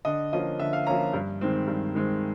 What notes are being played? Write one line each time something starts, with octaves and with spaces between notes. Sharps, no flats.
D3 D#5
F3 A#3 C#4 D#5
D3 E5
F5
F3 A#3 C#4 A#5
G2
D#3 G#3 C4
G2
D#3 G#3 C4